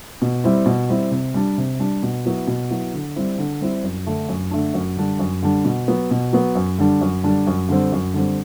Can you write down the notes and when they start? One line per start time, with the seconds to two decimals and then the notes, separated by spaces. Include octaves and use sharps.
0.22 B2
0.44 G3 C4 E4
0.66 B2
0.89 G3 C4 E4
1.11 C3
1.34 G3 D4
1.58 C3
1.79 G3 D4
2.03 B2
2.26 F#3 B3 E4
2.47 B2
2.71 F#3 B3 E4
2.94 D3
3.16 G3 C4 E4
3.38 D3
3.61 G3 C4 E4
3.83 F#2
4.06 D3 A3 D4
4.28 F#2
4.51 D3 A3 D4
4.74 F#2
4.97 D3 G3 D4
5.19 F#2
5.42 D3 G3 D4
5.65 B2
5.88 F#3 B3
6.11 B2
6.33 F#3 B3
6.55 F#2
6.78 D3 G3 D4
7.01 F#2
7.24 D3 G3 D4
7.47 F#2
7.69 D3 G3 C4
7.92 F#2
8.14 D3 G3 C4